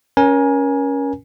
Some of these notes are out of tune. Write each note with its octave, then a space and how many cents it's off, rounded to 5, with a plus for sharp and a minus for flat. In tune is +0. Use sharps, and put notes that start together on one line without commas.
C#4 +5 A#4 +30 G#5 +0